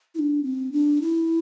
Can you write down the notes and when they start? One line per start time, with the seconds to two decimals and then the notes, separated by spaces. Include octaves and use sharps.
0.15 E4
0.19 D4
0.43 C4
0.72 D4
1.02 E4